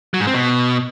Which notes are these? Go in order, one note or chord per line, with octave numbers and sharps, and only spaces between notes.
F#3
G#2
C4
B2